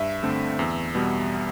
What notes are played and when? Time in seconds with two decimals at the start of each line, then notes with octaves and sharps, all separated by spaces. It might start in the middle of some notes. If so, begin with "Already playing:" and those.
Already playing: G2 E5
0.23 D3 A3 C4
0.59 E2
0.95 B2 G3 B3